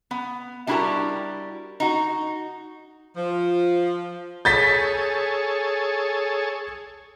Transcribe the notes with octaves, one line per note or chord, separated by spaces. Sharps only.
B3
G3 D4 E4 F#4 G4 A#4
D#4 F#4
F3
G#4 A4 C#5 G6 A6 B6